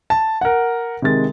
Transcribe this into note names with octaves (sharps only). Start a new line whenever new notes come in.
A5
A#4 F#5
C3 D#3 G#3 A6